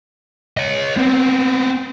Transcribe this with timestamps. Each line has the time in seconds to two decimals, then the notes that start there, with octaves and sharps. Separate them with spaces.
0.57 C#5 D#5
0.97 B3 C4